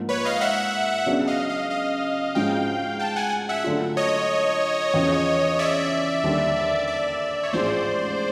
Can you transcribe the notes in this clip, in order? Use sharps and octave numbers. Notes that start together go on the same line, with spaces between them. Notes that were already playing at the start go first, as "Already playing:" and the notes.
Already playing: G#2 F3 A#3
B4 C#5
D#5 F5
E5 F#5
C#3 F#3 B3 D4 F#4
D#5 F5
D#5 F5
D#5 F5
G#2 F3 G#3 C#4 F#4 F5 G5
G5 A5
F#5 G#5
E5 F#5
D3 F#3 A3 D4 F4
C#5 D#5
E2 C#3 F3
D5 E5
D#2 D3 G3
D5 E5
C#5
A1 G#2 F3 G#3 C5 D5